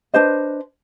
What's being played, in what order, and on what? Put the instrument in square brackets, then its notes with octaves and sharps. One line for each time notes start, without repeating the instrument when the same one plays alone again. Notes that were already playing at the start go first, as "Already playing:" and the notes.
[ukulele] D4 B4 C5 D#5